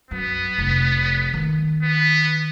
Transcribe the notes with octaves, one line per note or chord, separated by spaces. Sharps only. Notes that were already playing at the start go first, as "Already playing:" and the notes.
F#2 B3
F1
D#3 A#3
B3